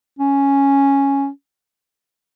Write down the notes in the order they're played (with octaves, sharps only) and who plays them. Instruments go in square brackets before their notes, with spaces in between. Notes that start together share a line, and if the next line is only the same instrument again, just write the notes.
[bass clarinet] C#4